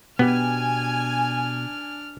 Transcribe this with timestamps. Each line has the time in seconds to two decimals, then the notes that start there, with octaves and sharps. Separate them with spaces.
0.19 B2 B3 D4 G4 G#5 F6